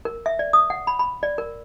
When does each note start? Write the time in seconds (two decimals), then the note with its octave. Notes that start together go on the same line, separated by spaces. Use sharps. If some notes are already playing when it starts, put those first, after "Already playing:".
0.05 A#4
0.26 E5
0.39 D5
0.53 D#6
0.70 F#5
0.87 B5
0.99 B5
1.23 D5
1.38 A#4